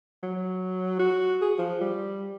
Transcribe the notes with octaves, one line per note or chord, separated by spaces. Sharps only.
F#3
F#4
G#4
F3
G3